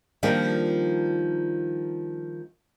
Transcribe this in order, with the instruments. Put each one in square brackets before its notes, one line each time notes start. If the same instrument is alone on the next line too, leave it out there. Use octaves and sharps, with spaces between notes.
[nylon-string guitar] D#3 F3 G3 A#3 D4